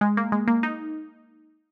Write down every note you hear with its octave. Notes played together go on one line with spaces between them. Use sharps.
G#3
A#3
G#3
A#3
D#4